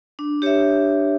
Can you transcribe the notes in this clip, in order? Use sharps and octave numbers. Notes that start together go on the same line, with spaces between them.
D4
G4 C#5 E5